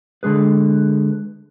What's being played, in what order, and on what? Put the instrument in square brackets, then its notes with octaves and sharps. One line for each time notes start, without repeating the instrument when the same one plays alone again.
[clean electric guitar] D3 G#3 G#4 B4